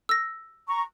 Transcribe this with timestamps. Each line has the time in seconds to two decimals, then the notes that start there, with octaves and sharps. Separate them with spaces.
0.09 E6 A#6
0.67 A#5 C#6